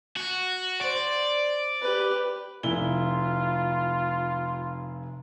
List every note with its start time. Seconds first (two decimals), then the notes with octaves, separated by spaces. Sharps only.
0.16 F#4
0.81 C5 D5
1.81 G4 B4
2.63 F1 E4 F4 G7